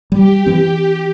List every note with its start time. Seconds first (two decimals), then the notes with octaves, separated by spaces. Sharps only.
0.12 G3 G4
0.46 E3 C4